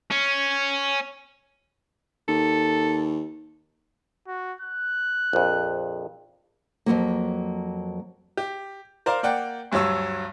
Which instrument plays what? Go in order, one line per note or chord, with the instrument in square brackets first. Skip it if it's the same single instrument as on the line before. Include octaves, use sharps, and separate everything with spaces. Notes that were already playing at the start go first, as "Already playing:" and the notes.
[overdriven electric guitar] C#4
[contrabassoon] D#2 [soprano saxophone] A4
[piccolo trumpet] F#4
F#6
[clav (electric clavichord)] A#1 F2
[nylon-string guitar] F2 F3 F#3 A#3
[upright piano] G4
A#4 C5 D5 F5 A#5
A#3 D5 F#5 G5
D2 G2 F#3 C#5 E6